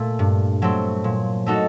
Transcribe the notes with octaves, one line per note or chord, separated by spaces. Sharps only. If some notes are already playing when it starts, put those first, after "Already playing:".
Already playing: A#2 A3
G2
F#3 A3 C4
A#2
A3 D#4 F#4 A4